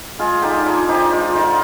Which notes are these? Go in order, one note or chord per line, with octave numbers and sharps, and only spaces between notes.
G#3 F4 G#4
D3 D#4 G4
D4 F4 G#4
F3 D#4 G4
G#3 F4
D3 D#4